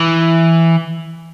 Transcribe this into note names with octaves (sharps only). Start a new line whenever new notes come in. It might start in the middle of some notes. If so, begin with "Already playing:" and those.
Already playing: E3